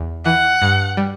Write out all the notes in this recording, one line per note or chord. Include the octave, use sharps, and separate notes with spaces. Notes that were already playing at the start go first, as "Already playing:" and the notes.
Already playing: E2
E3 F#5
G2
G3